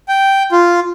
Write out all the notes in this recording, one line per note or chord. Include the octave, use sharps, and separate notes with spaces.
G5
F4